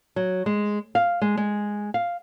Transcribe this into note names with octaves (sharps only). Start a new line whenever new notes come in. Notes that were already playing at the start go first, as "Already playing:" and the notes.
F#3
G#3
F5
G#3
G#3
F5